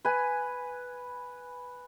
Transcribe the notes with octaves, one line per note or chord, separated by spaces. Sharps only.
B4 G#5